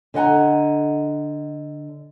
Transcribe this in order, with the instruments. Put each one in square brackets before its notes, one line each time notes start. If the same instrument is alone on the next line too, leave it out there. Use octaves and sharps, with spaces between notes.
[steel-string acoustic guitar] D3 D#5 F#5 G#5 A#5